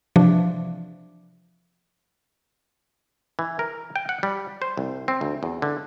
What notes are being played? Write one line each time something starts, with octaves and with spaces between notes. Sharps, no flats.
C3 E3 F3 D4
E3
A#4
G5
F#5
G3
C5
C2
C4
D2
E2
D3